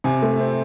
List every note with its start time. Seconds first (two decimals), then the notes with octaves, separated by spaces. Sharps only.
0.04 C3 G#5
0.22 A3
0.39 C4